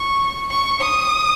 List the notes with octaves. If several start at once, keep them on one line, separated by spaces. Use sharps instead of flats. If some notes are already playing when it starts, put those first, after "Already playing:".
Already playing: C#6
C#6
D#6